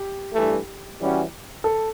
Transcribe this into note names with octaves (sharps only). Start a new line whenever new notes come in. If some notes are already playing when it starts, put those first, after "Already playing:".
Already playing: G4
G2 E3 A3
E3 G3 C#4 F#4
A4